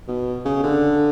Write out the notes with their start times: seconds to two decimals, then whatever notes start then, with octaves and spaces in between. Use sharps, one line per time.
0.08 B2
0.45 C#3
0.63 D3